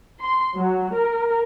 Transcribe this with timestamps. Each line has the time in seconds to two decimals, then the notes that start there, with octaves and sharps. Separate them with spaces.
0.21 C6
0.56 F#3
0.96 A#4